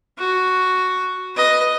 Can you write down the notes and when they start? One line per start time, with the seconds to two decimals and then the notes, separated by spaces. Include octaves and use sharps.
0.19 F#4
1.36 B4 D#5